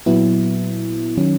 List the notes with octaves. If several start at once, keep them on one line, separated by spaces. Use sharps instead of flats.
A#2 F#3 B3 E4
D#3 F#3 C#4